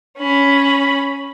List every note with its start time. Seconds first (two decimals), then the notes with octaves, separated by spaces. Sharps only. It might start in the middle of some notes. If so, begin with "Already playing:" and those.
0.18 C#4 B5